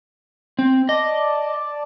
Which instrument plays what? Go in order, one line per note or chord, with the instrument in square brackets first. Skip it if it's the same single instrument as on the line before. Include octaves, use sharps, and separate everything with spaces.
[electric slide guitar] C4
[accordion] D5 A5 [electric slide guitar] D#5